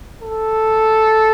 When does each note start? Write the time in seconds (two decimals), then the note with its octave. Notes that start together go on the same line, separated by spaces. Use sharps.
0.22 A4